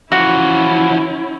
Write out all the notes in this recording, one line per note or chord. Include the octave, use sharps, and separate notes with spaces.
E3 F3 C#4 E4 F#4